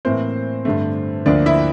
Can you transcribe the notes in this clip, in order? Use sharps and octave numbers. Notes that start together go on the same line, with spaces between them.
A2 E3 A#3 C4 C5
G2 D3 A3
D2 D3 F3 A#3 D4 D5
E4 E5